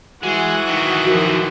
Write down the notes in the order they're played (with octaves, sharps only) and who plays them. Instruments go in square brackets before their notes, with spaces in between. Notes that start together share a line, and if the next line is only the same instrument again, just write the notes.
[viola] E3 F#5 [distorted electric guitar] G#3 [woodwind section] F#4
[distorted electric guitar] D#3 F#3
[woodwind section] F#2 F3 [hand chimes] F#4